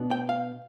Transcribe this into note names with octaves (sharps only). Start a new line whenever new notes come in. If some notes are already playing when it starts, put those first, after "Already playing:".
Already playing: B2 B3 D4
G5
F5